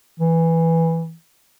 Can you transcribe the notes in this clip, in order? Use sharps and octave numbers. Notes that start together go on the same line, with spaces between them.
E3